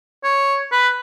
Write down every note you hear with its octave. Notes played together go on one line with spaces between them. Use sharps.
C#5
B4